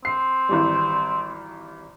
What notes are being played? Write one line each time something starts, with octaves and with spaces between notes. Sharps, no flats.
C4 C7
G#1 E3 G3